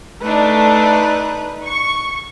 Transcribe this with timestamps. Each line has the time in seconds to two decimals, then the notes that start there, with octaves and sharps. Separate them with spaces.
0.22 A3 D4 D#4 B4
1.63 C#6